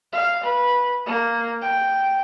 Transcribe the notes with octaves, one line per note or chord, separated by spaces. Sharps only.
F5
B4
A#3
G5